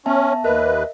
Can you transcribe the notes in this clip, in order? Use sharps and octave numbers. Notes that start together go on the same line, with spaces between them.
B3 C#4 E5 A5
D#2 A#4 B4 D#5 E5